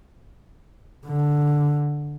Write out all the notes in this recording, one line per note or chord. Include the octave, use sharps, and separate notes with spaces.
D3